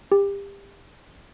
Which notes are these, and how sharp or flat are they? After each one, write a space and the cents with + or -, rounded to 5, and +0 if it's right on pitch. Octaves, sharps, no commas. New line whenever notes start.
G4 +30